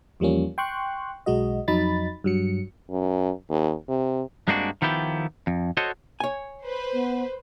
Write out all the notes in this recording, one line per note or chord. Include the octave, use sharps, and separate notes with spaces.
E2 F3 G3 A#3 C#4
G5 C6 C#6 F#6
B1 G#3 F#4 D#5
F2 F#3 D#4 B5 A6
G2 F#3 C#7
F#2
D#2
C3
G2 G#3 A#3 C4 D4 F#4
D#3 F3 B3 E4 G4
F2
F#4 A4 C5 C#5 D#5
C#5 G#5
B4 C5
B3